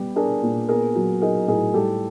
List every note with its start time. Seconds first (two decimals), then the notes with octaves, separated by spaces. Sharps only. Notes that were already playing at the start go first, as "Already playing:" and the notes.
Already playing: G3 B3 G4
0.16 D4 G#4 A#4
0.43 A#2
0.68 B3 G#4 A#4
0.95 F#3
1.21 D#4 G#4 A#4
1.48 A2 G#4 A#4
1.74 G3 G4 A4